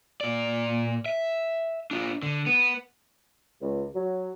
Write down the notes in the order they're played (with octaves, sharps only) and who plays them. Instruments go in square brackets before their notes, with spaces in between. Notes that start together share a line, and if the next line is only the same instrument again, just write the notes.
[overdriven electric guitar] A#2 D5
E5
D4 F4
D3
B3
[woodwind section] C#2
F#3